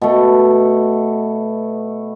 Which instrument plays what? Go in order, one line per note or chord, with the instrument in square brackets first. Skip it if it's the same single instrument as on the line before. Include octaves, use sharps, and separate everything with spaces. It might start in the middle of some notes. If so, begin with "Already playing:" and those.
[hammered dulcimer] B2 A3